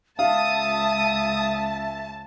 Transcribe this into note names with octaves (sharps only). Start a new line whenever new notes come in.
C#2 E5 F5 A5 D#6